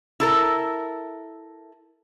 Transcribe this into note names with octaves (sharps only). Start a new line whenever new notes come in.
E4 A4 A#4